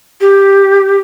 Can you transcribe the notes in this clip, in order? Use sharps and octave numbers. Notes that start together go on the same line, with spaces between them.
G4